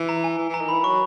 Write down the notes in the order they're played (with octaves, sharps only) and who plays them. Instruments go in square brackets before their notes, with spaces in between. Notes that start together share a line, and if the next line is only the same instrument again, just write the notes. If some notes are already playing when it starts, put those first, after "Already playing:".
Already playing: [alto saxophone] E3
[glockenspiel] A#5
G#5
[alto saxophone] E3
[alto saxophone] E3 [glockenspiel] A#5
[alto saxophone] D#3
[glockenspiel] B5
[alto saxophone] E3
[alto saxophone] F#3 [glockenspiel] C#6